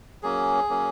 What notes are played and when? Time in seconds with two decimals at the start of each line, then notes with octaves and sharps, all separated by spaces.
0.23 F#3 A#3 C#4 G#4
0.69 F#3 A#3 C#4